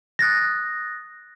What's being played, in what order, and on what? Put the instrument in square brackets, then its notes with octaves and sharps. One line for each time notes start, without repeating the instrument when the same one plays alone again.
[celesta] D#6 F#6 A6 A#6